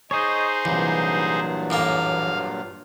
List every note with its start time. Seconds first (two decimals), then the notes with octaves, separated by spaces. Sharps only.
0.11 D#4 G#4 C5 C#5 D#5
0.65 C2 G2 A#2 E3 F#3
1.70 A1 F#2 A#3 F5